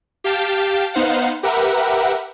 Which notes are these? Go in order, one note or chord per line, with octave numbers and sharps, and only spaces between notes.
G4 F5 G5 A5
B3 D#4 C5 F5 F#5
G4 A#4 B4 E5 F#5